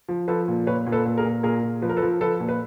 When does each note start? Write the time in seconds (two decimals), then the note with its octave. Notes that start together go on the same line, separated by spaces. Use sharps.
0.09 F3
0.28 F3 A4 B4
0.48 A#2
0.67 A#2 B4 C#5
0.87 A#2
0.92 A4 B4
1.05 A#2
1.18 G#4 A#4
1.24 A#2
1.43 A#2 G#4 A#4
1.63 A#2
1.82 F3 B4
1.89 A#4
1.97 A4 B4
2.02 F3
2.21 F3 A4 B4
2.40 A#2
2.49 B4